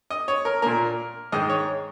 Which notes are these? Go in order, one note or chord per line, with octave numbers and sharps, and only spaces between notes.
D#5
C#5
A#4
A#2 A#3 A#4
G#2 D#3 G#3 D#5
C#5